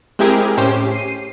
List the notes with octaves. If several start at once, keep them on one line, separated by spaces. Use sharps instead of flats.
G#3 C4 E4 G4 G#4 A#4
A2 C#4 G4 C5
C7 D#7